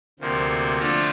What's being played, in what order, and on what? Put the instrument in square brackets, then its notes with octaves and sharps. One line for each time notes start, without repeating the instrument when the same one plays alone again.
[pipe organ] D2 C3 F3 A#3
D3 F3 A3 D4 F4